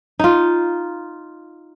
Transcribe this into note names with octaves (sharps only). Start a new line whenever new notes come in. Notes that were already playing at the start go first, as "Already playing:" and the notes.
D#4 F4